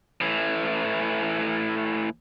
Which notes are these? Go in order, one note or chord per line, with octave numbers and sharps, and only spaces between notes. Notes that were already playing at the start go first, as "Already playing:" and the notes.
A2 E3